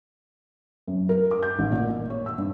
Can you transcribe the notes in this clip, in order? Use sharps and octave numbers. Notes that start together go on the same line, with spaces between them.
F#2
A#4
D6
G6
A1
A#2
A#3
C#5
E6
G2